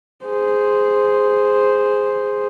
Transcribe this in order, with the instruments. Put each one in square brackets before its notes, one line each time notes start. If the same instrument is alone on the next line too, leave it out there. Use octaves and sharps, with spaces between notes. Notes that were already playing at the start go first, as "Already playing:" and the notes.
[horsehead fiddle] G#4 C5